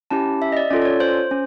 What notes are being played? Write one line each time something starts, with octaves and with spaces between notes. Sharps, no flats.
C#4 E4 G4 A5
E5
D#5
D5
C#4 F4 A4 D5
D5
C#5
C5
C#4